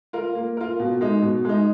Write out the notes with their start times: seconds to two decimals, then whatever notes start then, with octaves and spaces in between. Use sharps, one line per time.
0.13 F4 A#4
0.35 A#3
0.57 F4 A#4
0.79 B2
1.01 G#3 D#4
1.22 B2
1.45 G#3 D#4